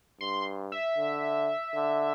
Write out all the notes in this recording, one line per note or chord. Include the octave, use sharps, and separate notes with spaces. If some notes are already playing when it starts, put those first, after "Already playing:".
G2 C6
E5
D3
D3